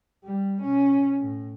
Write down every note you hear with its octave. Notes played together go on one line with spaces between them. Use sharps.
G3
B2 C#4
A2